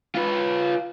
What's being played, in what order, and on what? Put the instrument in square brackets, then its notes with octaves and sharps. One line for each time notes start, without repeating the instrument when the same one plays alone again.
[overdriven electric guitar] F4 B4